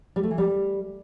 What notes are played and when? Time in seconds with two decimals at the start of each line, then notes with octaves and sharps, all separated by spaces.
0.16 G3
0.23 A3
0.31 E3
0.38 G3